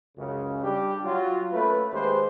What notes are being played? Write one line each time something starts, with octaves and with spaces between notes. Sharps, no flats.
C#2 F#2 C#3
G3 D4 G4
F#3 F4
A3 A#3 C#4 B4
D#2 G#3 G4 B4 C5